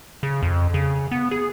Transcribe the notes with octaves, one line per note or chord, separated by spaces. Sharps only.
C#3
F2
C#3
B3
G#4